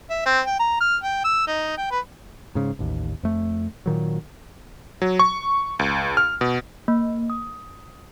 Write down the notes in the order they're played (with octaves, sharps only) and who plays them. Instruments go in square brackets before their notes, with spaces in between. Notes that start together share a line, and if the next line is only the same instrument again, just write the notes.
[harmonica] E5
C4
G5
A#5
F6
G5
E6
D#4
G5
B4
[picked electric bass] G#2 C#3
A1 D#2
F2 A3
A#2 D#3 F#3
[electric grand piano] F#3
C#6
C#2
F6
B2
[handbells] A#3
D#6